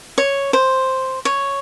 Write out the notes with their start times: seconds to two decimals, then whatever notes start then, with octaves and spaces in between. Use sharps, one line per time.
0.18 C#5
0.53 C5
1.25 C#5